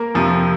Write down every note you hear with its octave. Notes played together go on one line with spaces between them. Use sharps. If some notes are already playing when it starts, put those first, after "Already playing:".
Already playing: A#3 A#4
F2 C3 F3